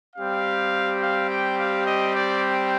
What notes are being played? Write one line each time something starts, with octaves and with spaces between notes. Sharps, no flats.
G3 C4 G4 F5
F5
G5
F5
D#5
D5